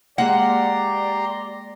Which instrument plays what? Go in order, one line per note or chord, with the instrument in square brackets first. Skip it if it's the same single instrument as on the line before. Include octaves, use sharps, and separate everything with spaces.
[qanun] G#3 A#3 [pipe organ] G4 A#5 C6 [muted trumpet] D5 [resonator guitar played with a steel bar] F#5